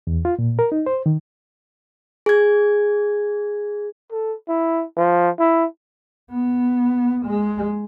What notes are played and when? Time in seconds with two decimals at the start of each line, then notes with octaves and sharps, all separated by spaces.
0.07 E2
0.25 F4
0.39 A#2
0.59 A#4
0.72 D#4
0.86 C5
1.06 D#3
2.26 G#4 G#6
4.11 A4
4.48 E4
4.97 F3
5.40 E4
6.31 B3
7.26 G#3